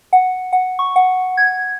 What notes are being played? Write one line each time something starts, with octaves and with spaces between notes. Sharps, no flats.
F#5
F#5
C#6
F#5
G#6